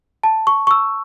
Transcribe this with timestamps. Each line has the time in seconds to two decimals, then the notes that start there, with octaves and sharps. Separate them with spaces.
0.23 A5
0.47 C#6
0.67 C#6
0.71 E6